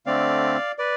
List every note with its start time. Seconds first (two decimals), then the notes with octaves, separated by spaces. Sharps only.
0.06 D3 A3 C4 D5 F5
0.78 B4 D5